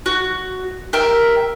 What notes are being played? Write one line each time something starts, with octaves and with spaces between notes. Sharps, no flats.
F#4
G4 A#4 E5